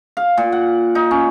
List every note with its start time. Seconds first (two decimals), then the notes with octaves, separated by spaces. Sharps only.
0.17 F5
0.38 A#2
0.52 F#5
0.95 D#4
1.11 C#4